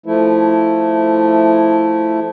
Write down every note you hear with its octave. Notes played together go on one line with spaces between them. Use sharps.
F3 A3 E4